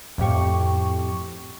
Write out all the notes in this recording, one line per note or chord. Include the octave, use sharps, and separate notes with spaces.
F2 A2 G4 C#6